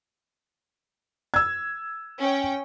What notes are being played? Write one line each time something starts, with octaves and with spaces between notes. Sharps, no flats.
E6 G#6
C#4 G5